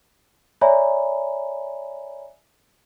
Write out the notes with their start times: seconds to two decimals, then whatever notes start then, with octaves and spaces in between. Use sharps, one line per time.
0.61 C#5 D5 E5 G#5 A#5 B5